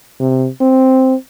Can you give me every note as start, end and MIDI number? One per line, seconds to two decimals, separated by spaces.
0.20 0.48 48
0.61 1.15 60